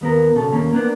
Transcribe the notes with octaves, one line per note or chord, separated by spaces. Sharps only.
D#2 B3 A#4
B1 C#3 A4
D#2 A#3 C#4
A#3 B3 D4